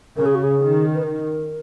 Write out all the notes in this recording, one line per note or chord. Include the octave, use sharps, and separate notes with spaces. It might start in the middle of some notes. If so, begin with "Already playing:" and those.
C#3 A#4
G#4
F#4
G#4
D#3
B4
A#4